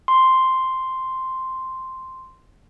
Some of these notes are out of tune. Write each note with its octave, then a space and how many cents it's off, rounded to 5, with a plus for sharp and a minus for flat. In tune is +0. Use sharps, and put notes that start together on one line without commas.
C6 -5